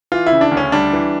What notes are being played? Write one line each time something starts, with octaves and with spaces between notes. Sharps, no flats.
E3 F4
E4
C#3
D4
D2
C#4
G3 D4
E3